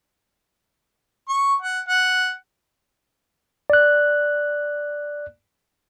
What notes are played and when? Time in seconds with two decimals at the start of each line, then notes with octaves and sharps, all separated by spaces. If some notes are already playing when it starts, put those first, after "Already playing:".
1.29 C#6
1.62 F#5
1.89 F#5
3.70 D5 F#6